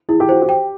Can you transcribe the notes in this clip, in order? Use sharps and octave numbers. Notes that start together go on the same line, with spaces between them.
E4 G#4
G4
F#4 C5
G4
G5